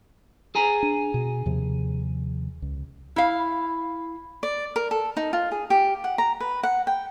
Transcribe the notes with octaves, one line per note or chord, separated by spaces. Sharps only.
G#4 G#5 A#5
D4
B2
D#2 C3 F3
C#2
E4 F5
D5
A#4
A4
D#4
F4
G#4
G4
F#5
A#5
B4
F#5
G5